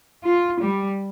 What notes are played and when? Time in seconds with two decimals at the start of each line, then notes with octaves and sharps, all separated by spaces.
0.25 F4
0.61 G3